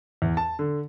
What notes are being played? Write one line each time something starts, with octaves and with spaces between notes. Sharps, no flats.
E2
A5
D3